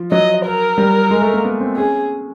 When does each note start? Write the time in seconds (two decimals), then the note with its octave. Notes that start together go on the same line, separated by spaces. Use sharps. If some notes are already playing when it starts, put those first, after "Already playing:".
Already playing: F3
0.11 F#3 D#5
0.45 A#4
0.78 G3
1.10 G#3
1.22 A3
1.33 A#3
1.45 B3
1.60 C4
1.77 C#4 G#4